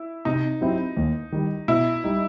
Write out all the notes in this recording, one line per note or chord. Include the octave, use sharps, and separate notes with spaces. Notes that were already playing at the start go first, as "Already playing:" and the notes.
Already playing: E4
C3 D#4
F#3 C4 E4 G4
D#2
D#3 G3
B2 E4
G3 D#4